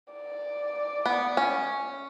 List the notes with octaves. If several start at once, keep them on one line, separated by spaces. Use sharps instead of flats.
D5
B3
C#4